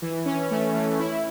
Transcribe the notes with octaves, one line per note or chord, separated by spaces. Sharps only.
E3
C#4
A3
E3
E4